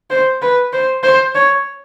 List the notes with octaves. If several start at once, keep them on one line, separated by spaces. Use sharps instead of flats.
C5
B4
C5
C5
C#5